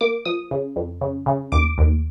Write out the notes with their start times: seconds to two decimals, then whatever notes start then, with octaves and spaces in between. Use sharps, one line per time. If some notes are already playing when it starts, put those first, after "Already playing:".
0.01 A#3 D6
0.25 F3 D#6
0.51 C#3
0.76 F2
1.01 C#3
1.26 C#3
1.52 D#2 D6
1.78 D#2